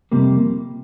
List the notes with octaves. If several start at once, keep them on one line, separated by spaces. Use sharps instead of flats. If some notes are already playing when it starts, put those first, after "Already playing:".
F2 C3 G3 A#3